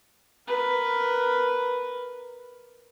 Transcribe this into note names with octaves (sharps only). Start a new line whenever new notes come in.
A#4 B4